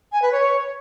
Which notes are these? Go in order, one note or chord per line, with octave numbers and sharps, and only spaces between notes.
G#5
B4
C#5